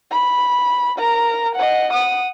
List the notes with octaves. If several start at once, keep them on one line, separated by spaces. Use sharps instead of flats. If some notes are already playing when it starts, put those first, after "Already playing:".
B5
A#4 A#5
D#5 F#5
F#5 D#6